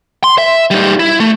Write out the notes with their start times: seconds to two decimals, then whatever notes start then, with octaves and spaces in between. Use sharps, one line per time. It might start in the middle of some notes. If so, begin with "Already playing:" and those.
0.24 C6
0.38 E5
0.71 G3 D#4
0.99 E4
1.20 A3